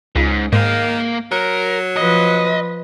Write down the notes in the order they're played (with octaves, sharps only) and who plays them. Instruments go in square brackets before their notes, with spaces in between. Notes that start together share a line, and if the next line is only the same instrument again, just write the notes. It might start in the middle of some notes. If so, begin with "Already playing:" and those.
[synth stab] C#2 [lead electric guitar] G#2
[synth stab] G#2 [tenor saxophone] D#3 [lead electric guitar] A#3 F5
[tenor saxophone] F#3 [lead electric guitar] A#4
[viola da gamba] F3 B4 [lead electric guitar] D#5